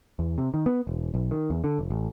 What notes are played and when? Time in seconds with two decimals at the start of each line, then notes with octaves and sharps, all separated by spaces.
0.19 E2
0.38 C3
0.54 D#3
0.66 B3
0.87 E1
1.14 B1
1.31 D#3
1.50 E2
1.64 D3
1.79 F1
1.90 A1